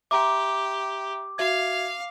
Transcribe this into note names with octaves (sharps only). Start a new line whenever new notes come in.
G4 E5 A#5 C6 D6
F#4 E5 F5 G#6